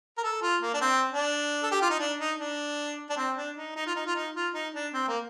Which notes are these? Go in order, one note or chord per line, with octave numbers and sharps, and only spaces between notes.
A#4
A4
F4
A#3
D4
C4
D4
A4
G4
F4
D#4
D4
D#4
D4
D4
C4
D4
D#4
D#4
F4
D#4
F4
D#4
F4
D#4
D4
C4
A#3